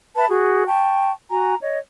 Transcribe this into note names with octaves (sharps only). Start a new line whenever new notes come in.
B4 E5 A5 B5
F#4 G#4
G5 A5 C#6
F#4 G#5 A#5
C#5 D#5